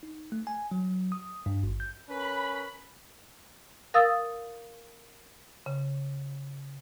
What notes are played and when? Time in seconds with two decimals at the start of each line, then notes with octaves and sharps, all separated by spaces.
0.03 D#4
0.32 A3
0.47 G#5
0.71 F#3
1.12 D#6
1.46 G2
1.63 G#1
1.80 G6
2.09 C#4 A#4 B4 B5
3.94 A#4 F5 D#6 E6 A6
5.66 C#3